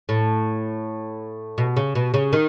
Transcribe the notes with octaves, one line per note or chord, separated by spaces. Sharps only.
A2
B2
C#3
B2
C#3
D#3